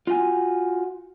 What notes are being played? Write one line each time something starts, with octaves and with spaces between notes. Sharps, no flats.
F4 F#4 G#5